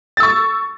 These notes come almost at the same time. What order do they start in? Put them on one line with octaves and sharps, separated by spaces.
A6 E6 C#6